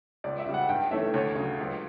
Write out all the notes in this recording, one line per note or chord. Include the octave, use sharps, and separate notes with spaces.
C#2 D5
E5
C#3 G3
F#5
G2 G5
E3 A3 C#4 E5
D2 C#5
C#3 F#3
C#2